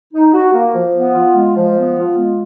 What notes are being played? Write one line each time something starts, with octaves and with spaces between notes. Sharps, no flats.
D#4
F#4
A#3
F3
B3
F4
G#3
F3
B3
F4
G#3